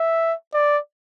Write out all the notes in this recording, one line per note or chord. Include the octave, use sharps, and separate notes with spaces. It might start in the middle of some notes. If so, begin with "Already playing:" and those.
Already playing: E5
D5